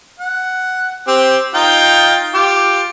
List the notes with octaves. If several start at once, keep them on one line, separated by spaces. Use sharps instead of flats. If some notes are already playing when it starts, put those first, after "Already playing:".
F#5
C4 G4
D#4 F4 G5
F4 G4